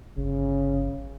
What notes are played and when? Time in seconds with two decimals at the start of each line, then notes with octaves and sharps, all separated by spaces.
0.17 G1 C#3